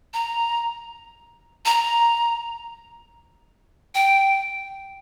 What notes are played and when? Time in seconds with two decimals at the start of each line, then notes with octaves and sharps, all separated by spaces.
0.14 A#5
1.65 A#5
3.95 G5